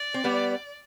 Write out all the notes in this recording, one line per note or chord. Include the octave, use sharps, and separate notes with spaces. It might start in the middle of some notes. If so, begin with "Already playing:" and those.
Already playing: D5
C4
G3 B3